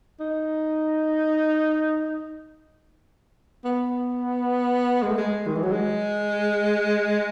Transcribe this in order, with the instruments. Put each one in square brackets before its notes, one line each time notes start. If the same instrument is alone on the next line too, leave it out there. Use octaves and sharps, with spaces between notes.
[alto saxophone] D#4
B3
G#3
A3
G#3
D#3
E3
F#3
G#3